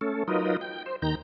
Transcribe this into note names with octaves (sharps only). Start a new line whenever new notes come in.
A3 C#4 A4
F#3 D#4 F4 A#4 B4 D#5
G5
C5
D#2 D#3 A#5 G6